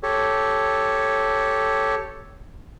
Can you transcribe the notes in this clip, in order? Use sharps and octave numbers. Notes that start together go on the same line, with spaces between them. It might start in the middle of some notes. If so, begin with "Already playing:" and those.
G4 A4 C#5